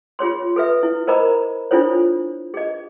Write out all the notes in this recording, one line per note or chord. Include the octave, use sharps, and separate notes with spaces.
F4 G#4 C#5 C6
A4 B4 E5
E4
A#4 C5 D#5 A#5 B5
D4 E4 F4 A4 C5 C#5
G#4 D#5